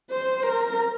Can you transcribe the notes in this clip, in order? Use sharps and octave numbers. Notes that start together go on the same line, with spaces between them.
C5
A#4